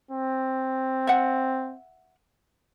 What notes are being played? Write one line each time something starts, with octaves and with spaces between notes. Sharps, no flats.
C4
E5 F#5